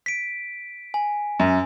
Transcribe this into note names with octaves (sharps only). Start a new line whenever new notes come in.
B6 D7
G#5
F#2